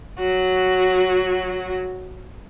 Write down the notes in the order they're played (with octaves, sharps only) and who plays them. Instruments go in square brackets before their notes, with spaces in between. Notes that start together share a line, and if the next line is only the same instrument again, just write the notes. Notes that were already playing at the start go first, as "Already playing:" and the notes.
[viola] F#3 F#4